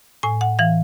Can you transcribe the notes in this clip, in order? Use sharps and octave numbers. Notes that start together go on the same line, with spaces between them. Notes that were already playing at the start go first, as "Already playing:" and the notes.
A2 G#5
F#5
E3 F5